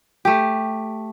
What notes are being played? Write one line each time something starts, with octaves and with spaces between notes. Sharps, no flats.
A3 G4